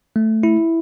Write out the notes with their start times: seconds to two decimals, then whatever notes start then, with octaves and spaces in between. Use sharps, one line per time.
0.16 A3
0.43 E4